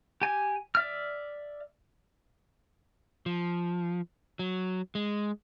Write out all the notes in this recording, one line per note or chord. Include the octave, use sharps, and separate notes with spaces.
G4 G#5
D5 E5 F6
F3
F#3
G#3